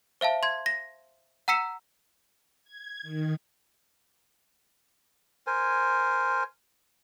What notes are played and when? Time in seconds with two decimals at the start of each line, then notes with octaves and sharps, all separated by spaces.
0.21 C5 E5 F5 A5
0.43 C6 G#6
0.66 A#6
1.48 F#5 A#5 E6 B6 C#7 E7
2.64 G#6
3.02 D#3
5.47 A#4 C5 G#5